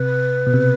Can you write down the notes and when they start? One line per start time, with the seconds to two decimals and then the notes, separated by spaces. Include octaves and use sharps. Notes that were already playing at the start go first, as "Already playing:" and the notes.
Already playing: C3 B4
0.47 B2
0.54 C3